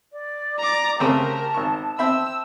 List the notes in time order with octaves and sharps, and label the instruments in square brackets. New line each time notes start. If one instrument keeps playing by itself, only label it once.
[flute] D5
[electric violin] A#5 D6
[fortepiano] C#3 A3 C4 [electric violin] G4 A#4 [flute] A5
[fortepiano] G#1 C#6
[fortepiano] C4 E5 B5 [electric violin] E6